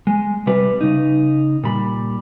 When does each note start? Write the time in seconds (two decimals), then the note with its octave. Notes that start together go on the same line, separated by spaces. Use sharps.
0.07 G#3
0.47 C3 G3 B4
0.81 C#3 D#4
1.63 A#2 G3 B5